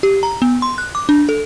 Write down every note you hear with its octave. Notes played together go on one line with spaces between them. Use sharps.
G4
A#5
B3
C6
F#6
D6
D4
A4